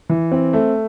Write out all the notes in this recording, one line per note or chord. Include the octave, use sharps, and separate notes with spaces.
E3
C4
A3